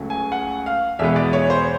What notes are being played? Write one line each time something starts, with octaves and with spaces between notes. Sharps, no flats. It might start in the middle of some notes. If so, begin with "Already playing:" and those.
Already playing: C#2 C#3 F#3 A3
G#5
F#5
F5
E2 B2 G#3 B3 E5
D5
C#5
C5